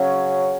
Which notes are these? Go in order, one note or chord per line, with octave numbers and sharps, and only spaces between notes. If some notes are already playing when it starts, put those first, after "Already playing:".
Already playing: C#3 F#3 C#4